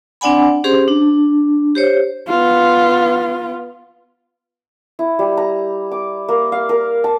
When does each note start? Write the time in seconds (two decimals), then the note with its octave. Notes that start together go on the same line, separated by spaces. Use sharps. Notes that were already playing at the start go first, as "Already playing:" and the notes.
0.21 C4 D4 D5 F#5 G#5 B5
0.64 C#4 G4 G#4 C5 C6
0.88 D4
1.75 G4 C5 C#5
2.28 B3 F4
4.99 E4
5.19 G3
5.37 A#5
5.91 D6
6.28 A#3
6.52 F5
6.69 A#4
7.04 A5